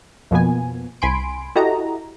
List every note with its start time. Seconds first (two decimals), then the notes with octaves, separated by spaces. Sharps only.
0.31 F2 B2 F3 A#3 B3 G#5
1.02 C2 G#5 B5 C6 D7
1.56 E4 F#4 G4 A4 D#5 A#5